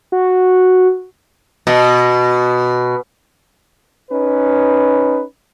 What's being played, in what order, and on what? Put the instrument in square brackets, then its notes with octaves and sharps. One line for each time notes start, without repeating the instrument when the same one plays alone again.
[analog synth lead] F#4
[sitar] B2
[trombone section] C#4 D#4 B4